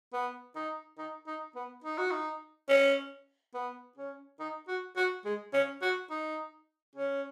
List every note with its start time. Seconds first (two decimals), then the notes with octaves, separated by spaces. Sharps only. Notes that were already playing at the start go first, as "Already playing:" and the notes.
0.13 B3
0.56 D#4
0.98 D#4
1.27 D#4
1.56 B3
1.84 D#4
1.98 F#4
2.11 D#4
2.69 C#4
3.54 B3
3.97 C#4
4.40 D#4
4.68 F#4
4.97 F#4
5.25 G#3
5.54 C#4
5.82 F#4
6.10 D#4
6.96 C#4